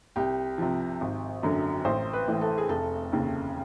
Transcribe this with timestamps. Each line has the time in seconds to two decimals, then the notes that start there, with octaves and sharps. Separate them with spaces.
0.16 C2 G4
0.58 C3 F3
1.01 G#1
1.43 F#2 D3 F#3
1.85 A1 C5
2.13 B4
2.28 A2 E3
2.41 A4
2.58 G#4
2.69 F1 A4
3.12 D#2 C#3